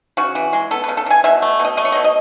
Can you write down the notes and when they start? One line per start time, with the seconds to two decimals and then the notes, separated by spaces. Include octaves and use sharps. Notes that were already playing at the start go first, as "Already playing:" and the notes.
0.17 C#3 F#4
0.35 E3
0.53 G#3
0.71 B3 A4
0.84 B4
0.88 C#3
0.97 A4
1.06 E3 G#5
1.24 B2 E5
1.42 A3
1.59 B2
1.65 D#5
1.77 A3 D#5
1.85 C#5
1.92 D#5
1.95 B2
2.04 D#5